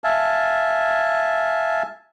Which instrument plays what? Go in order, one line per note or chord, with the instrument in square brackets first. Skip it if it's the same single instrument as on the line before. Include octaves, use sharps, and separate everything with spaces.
[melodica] E5 F5 G#5 A5